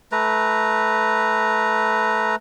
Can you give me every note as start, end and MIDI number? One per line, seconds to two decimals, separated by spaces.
0.12 2.36 57
0.12 2.36 71
0.12 2.36 82